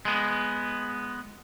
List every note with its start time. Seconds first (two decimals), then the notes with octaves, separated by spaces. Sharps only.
0.05 G#3 B3